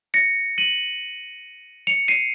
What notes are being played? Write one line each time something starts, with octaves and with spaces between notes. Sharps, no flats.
A#6 C#7
D#7 F#7
C#7 F7
C7 D#7